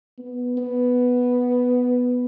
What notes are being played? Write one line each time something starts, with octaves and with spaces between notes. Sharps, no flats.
B3
B3